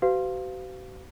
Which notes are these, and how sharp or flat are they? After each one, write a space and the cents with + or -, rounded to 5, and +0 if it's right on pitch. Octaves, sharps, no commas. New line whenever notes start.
F#4 +45 B4 +45 F5 +0